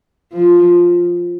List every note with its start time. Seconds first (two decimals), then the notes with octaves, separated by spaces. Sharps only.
0.33 F3